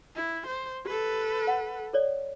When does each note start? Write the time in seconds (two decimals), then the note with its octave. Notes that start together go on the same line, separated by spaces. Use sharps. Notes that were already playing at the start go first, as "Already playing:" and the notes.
0.15 E4
0.47 C5
0.86 G4 A4 B4
1.47 F#5
1.93 A4 C#5 D5